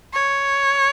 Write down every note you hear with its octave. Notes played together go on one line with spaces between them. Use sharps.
C#5